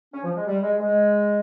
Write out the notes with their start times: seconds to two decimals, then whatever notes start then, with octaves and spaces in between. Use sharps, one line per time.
0.14 C#4
0.24 F3
0.36 G#3
0.46 G3
0.63 G#3
0.80 G#3